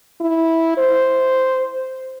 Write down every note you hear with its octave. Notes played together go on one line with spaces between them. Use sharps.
E4
C5